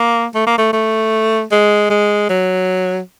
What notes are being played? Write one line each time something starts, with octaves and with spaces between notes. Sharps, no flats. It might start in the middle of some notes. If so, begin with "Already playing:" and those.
Already playing: A#3
A3
A#3
A3
A3
G#3
G#3
F#3